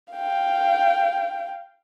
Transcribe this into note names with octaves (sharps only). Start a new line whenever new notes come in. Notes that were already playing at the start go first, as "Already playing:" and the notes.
F5 G5